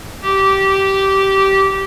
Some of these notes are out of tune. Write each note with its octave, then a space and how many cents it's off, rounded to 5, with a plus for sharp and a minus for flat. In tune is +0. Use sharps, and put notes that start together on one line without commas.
G4 -15